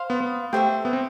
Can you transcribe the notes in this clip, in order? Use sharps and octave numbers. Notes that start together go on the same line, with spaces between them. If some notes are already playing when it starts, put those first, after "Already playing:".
Already playing: C5 F5 C6
B3
B3
A3 G4 C5 E5 G5
B3
C4